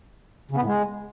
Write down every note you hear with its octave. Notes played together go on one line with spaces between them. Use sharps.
C#3
B3
A2
G#3